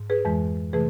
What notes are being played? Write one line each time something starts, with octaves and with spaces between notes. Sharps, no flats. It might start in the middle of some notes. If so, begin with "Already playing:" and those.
Already playing: G#2
G#4 B4
F2 E3 G#3
C3 E3 A3 G#4 B4